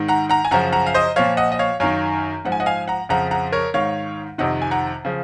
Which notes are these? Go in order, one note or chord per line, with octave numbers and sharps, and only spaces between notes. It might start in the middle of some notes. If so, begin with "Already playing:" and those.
Already playing: G#2 D#3
F#5 A#5
F#5 A#5
G#5
F#2 C#3 F3 F#5 A#5
F#5 A#5
F5
C5 D#5
A#2 F3 C#5 F5
D#5 F#5
D#5
C#5 F5
F#2 D#3 C#5 F5
G#2 F3 F#5
G#5
D#5 F#5
F5 G#5
F#5 A#5
F2 C#3 F3 F#5 A#5
F#5 A#5
A#4 C#5
G#2 D#3 C#5 F5
F2 C3 D#3 D#5 F#5
G#5
F#5 A#5
C#3 F3